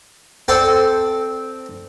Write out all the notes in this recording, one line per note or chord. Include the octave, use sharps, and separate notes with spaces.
C4 A4 C5 D5 G5